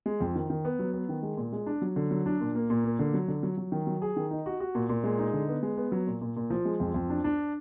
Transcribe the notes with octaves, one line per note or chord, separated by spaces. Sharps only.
G#3
F2
D#3
D#3
B3
F#3
B3
D#3
G#3
A#2
G#3
D4
F#3
D3
F#3
D4
A#2
A#3
A#2
A#3
D3
F#3
D3
F#3
F#3
D#3
F#3
G#4
D#3
D#4
F#4
F#4
A#2
A#2
G#3
D#4
D3
B3
G#3
B3
F#3
A#2
A#2
A#2
F3
G#3
F2
F2
D4
D4